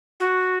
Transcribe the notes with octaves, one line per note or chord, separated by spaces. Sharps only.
F#4